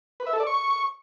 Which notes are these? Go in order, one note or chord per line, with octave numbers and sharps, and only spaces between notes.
B4
E5
A4
D5
C#6